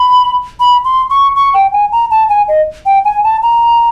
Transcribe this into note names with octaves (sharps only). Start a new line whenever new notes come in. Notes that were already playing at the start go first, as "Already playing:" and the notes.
Already playing: B5
B5
C6
C#6
C#6
G5
G#5
A#5
A5
G#5
D#5
G5
G#5
A5
A#5